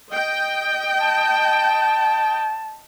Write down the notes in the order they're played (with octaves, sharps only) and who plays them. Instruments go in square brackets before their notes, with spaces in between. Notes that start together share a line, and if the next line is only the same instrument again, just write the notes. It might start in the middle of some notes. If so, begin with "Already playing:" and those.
[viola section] D#5 G5
[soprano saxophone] A5